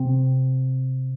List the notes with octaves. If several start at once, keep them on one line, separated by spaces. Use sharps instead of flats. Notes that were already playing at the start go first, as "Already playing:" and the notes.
Already playing: C3 C4